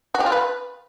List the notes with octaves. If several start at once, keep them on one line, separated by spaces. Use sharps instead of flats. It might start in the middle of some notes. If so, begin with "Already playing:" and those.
F#4
G4
F4
B4